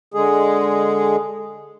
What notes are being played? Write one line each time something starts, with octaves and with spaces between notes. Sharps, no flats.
D3 G#3 G#4